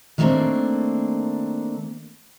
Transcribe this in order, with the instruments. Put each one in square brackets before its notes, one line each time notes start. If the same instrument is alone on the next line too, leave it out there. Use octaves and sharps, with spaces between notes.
[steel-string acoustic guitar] D#3 G3 A3 A#3 C4 D4